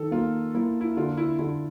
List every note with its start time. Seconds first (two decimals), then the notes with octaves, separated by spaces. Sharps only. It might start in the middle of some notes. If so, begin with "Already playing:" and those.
Already playing: D#3 A4
0.11 A#3 F4
0.55 A#3 E4
0.81 E4
0.97 D3 F4
1.17 E4
1.39 D3 E4